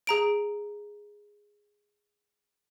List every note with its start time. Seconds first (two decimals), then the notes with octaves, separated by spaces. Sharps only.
0.07 G#4 A#5 D7